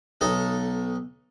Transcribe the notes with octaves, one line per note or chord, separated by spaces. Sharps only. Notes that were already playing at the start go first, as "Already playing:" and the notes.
B1 D#4 A4